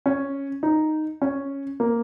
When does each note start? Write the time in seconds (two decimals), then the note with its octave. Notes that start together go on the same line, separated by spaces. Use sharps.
0.06 C#4
0.63 D#4
1.22 C#4
1.80 A#3